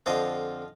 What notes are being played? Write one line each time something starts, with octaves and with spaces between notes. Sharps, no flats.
F2 D3 F3 D#5 F5